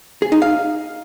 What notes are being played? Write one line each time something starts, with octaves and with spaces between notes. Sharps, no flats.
G#4
D#4
F5